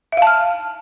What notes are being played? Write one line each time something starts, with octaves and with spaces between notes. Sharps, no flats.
E5 F5 A5 F6